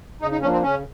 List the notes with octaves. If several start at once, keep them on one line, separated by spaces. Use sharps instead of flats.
C#3 D#4
D#4
F3 A#3 C#4 D4
C4
C#3 C#4